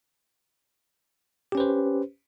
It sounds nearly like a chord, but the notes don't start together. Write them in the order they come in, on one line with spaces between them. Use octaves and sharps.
G4 C#4 B4 C5